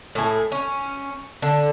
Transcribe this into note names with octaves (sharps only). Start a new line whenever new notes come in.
A2 G#4
C#4
D3